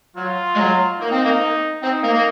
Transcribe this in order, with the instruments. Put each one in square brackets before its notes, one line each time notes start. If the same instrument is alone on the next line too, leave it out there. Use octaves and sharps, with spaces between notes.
[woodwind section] F#3 [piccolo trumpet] F4
[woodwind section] G#3
F#3
[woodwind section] A#3 [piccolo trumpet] D#4
[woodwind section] C4
A#3
[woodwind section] C4 [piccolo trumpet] D#4
[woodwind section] A#3
A#3